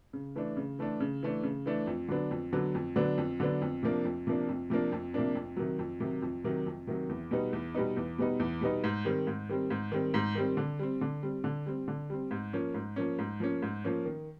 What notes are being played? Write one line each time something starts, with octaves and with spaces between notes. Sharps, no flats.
C#3
E3 A3 D4
C#3
E3 A3 D4
C#3
E3 A3 D4
C#3
E3 A3 D4
F2
D3 F#3 B3 D4
F2
D3 F#3 B3 D4
F2
D3 F#3 B3 D4
F2
D3 F#3 B3 D4
F2
C3 F3 A#3 D4
F2
C3 F3 A#3 D4
F2
C3 F3 A#3 D4
F2
C3 F3 A#3 D4
F2
C3 D#3 F#3
F2
C3 D#3 F#3
F2
C3 D#3 F#3
F2
C3 D#3 F#3
E2
B2 G3 B3 D#4
E2
B2 G3 B3 D#4
E2
B2 G3 B3 D#4
E2
B2 G3 B3 D#4
G#2
D#3 G3 C4
G#2
D#3 G3 C4
G#2
D#3 G3 C4
G#2
D#3 G3 C4
D3
G3 C4
D3
G3 C4
D3
G3 C4
D3
G3 C4
G#2
F3 A#3 C#4
G#2
F3 A#3 C#4
G#2
F3 A#3 C#4
G#2
F3 A#3 C#4
D#3